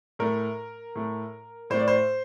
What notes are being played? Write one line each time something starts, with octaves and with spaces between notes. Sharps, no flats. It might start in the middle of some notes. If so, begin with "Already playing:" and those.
A2 A3 A#4
A2 A3
A2 A3 C5
D5
C5